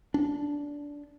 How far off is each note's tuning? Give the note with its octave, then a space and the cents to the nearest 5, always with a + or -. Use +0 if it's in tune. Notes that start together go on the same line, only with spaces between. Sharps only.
D4 -15